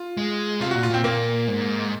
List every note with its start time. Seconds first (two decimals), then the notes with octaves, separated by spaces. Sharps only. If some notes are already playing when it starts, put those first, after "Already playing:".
Already playing: F4
0.17 G#3
0.60 C3 F4
0.71 A#2 F#4
0.83 F4
0.90 A#2 C4
1.04 A#2 A#3
1.48 G#2